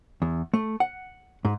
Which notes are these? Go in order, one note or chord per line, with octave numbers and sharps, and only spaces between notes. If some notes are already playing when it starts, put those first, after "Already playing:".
E2
A3
F#5
G#2